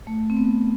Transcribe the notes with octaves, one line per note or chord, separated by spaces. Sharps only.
A3
C4
B3